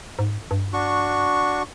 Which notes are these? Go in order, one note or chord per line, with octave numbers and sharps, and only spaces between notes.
G#2
G2
D4 F#4 C#6